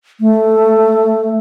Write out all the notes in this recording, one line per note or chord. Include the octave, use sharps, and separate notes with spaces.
A3